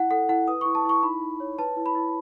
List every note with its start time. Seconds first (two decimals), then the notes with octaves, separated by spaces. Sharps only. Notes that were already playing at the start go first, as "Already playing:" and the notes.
Already playing: E4 F#5
0.11 A4 F#5
0.29 E4 F#5
0.48 B4 D#6
0.61 E4 C#6
0.75 A5
0.85 E4 C#6
1.03 D#4 B5
1.22 D#4
1.40 C#5
1.59 B4 A5
1.77 E4
1.86 B5
1.95 E4